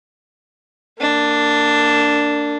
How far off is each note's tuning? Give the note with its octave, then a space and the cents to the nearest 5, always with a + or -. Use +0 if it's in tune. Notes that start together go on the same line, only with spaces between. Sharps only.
A#3 -30 D4 +0